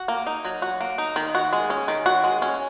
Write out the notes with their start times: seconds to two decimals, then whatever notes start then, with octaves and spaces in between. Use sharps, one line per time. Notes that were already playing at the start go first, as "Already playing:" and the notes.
Already playing: F#4
0.08 A#3
0.27 D#4
0.45 F#3
0.62 F#4
0.81 A#3
0.98 D#4
1.16 D#3
1.35 F#4
1.53 G#3
1.70 C#4
1.88 D#3
2.06 F#4
2.24 G#3
2.42 C#4